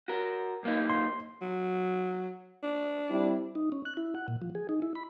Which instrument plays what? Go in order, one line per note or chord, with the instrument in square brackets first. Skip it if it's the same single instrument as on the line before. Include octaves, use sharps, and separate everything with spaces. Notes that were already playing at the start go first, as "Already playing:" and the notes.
[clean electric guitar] F#4 A#4
B1 A#3 D#4
[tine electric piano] C6
[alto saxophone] F#3
D4
[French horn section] G3 C4 E4
[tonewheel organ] D#4
C#4
F#6
E4
F#5
A#2
F3
G#4
D#4
E4
B5